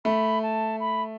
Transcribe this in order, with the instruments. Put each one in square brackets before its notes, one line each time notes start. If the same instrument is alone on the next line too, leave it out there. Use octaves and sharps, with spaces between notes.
[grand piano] A3 [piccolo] B5
[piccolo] A5
B5